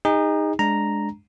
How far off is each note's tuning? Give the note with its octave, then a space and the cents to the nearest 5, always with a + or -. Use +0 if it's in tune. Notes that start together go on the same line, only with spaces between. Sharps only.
D#4 +0 G#4 -40
G#3 +0 D4 +0 A#5 +0